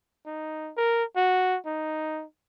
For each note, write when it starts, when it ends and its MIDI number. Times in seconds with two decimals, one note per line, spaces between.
0.26 0.72 63
0.77 1.04 70
1.17 1.58 66
1.66 2.25 63